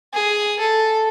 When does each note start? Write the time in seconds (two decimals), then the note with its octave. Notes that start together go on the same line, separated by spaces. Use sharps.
0.14 G#4
0.60 A4